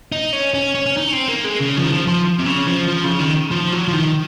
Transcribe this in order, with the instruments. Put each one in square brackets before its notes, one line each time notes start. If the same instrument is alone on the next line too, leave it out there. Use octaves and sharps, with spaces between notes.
[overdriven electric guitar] D#4
C#4
C#4
C#4
C#4
D#4
C#4
C4
A#3
G#3
C#3
F3
D#3
F3
F3
C3
C#3
F3
F3
C#3
D#3
F3
F#3
F3
D#3